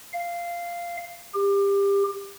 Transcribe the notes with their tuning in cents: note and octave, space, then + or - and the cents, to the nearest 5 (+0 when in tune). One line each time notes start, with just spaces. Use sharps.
F5 -10
G4 +25